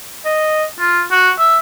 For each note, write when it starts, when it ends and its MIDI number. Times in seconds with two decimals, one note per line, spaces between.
0.25 0.64 75
0.80 1.02 65
1.12 1.30 66
1.39 1.58 76